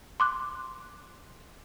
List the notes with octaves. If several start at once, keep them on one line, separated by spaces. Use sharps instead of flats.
C6 D6 F#6